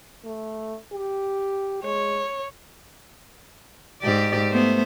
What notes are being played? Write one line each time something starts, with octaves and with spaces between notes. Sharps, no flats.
A3
G4
G#3 C#5
G#2 G4 D5
A3 B3 C5